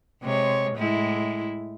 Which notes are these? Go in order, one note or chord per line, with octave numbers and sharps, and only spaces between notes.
C3 G#3 C#5
A2 G#3 E4